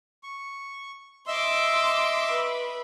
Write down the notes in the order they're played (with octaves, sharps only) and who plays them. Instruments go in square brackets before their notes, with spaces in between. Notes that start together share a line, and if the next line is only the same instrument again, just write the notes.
[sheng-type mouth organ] C#6
[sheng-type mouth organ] D#5 E5 E6 [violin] C6 D6
[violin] B4